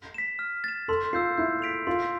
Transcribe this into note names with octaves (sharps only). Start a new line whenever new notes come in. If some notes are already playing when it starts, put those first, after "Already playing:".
B6 E7
F6
A6 E7
A4 C6
F4 E6 G6 C7
E4 G6
B6 D7 F7
F4 C6